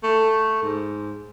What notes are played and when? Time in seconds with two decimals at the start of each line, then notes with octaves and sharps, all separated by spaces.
0.03 A3
0.63 G#2